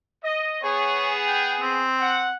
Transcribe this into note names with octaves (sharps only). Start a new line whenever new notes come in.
D#5
B3 G#4 C#5
G5
C4
F#5